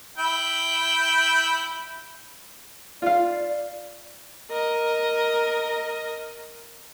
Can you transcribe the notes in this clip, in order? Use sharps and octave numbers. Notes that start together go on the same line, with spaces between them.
E4 G5
F4 D5 F5
A#4 D#5